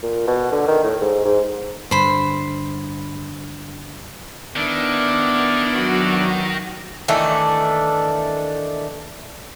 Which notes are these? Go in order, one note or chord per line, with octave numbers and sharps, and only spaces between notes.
A#2
B2
D3
D#3
A2
G#2
G#2
G2 D3 C5 B5
D#3 B3 D4 E4 D5
F#3 F#4
D#3 E3 A3 D4